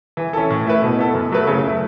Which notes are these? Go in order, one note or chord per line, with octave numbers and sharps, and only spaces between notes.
E3
C#4 E4 A4
A2
A3 E4 B4
B2
B3 E4 A4
F#2
F#3 A3 E4 B4
C#3
A3 E4